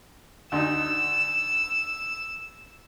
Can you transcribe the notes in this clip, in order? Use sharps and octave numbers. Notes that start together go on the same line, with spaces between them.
D2 D#4 E6